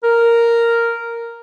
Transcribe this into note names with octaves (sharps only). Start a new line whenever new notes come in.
A#4